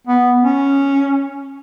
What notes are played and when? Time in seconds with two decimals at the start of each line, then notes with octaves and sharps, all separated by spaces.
0.07 B3
0.43 C#4